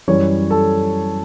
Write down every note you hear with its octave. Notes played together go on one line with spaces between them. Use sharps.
F#2 E3 G3 C#5
A4